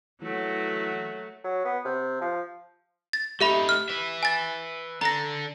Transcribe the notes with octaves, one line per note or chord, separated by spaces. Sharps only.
E3 F#3 A3 F#4
F#3
B3
C3
F3
A6
A3 D#4 G4 E5 B5
F6
B4 E5
G#5 A6
D4 A4 A#5 A#6